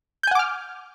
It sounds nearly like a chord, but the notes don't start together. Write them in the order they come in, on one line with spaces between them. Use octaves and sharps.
G6 G#5 F#5 D6 F6